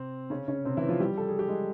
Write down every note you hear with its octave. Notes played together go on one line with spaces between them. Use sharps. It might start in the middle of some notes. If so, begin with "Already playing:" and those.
Already playing: C3 C4
C#3 C#4
C#3 C#4
C3 C4
E3 E4
F3 F4
G3 G4
A4
G#4
G4
G#3 G#4